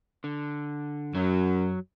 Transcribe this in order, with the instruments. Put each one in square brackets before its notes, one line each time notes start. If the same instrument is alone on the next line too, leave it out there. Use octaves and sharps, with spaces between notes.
[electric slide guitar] D3
[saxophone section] F#2 [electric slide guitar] F#3